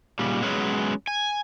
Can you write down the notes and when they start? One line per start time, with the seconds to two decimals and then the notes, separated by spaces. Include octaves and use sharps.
0.19 A#2 C#3 G3
0.42 F#3 G#3 B3 C#4
1.08 G#5